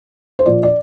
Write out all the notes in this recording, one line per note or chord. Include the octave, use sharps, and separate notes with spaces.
C5
A#2 F3 D5
D5